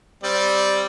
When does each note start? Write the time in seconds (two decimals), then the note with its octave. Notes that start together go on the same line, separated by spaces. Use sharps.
0.23 G3 C4 D5